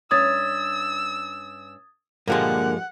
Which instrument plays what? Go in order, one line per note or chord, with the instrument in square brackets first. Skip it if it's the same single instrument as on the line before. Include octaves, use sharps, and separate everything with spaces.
[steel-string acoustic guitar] G2 C#4 [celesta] D#6 G#6 A6 [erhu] E6
[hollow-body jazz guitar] G2 F3 G#3 [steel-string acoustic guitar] A#2 D3 A#3 [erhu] F#5